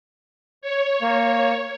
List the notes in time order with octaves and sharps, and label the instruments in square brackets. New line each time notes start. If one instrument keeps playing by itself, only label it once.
[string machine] C#5
[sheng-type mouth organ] A#3